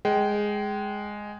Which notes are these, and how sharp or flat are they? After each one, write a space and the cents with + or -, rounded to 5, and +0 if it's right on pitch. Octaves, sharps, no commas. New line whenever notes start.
G#3 +0 G5 -25